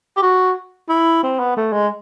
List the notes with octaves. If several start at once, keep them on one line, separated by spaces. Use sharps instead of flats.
G4
F#4
E4
C4
B3
A3
G#3